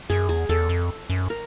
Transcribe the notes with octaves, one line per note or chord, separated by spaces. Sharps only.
F#2 G#4
E2 G#4
E2 A4
F2
F#2
A#4